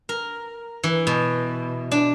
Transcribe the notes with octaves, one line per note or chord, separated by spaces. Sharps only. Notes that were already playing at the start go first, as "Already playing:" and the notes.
A#4
E3
B2
D4